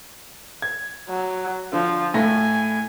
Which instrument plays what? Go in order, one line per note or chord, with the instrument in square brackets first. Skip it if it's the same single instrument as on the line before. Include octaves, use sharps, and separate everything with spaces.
[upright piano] G#6
[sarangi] F#3
[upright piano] D3 [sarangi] F3
[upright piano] A2 A3 A#6 [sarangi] G#5